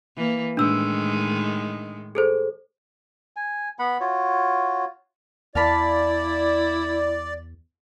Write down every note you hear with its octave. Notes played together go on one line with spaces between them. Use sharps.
E3 A#3
A2 D#3 G#3 D4 E6
G#4 A4 C5
G#5
B3 F#5 B5
F4 F#4 C#5
E2 E4 D5 F5 A5 B5